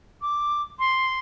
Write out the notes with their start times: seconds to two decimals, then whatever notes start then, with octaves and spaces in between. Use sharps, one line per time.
0.21 D6
0.79 C6